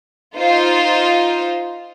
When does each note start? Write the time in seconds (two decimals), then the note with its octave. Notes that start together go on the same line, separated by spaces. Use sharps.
0.36 D#4 F4 C5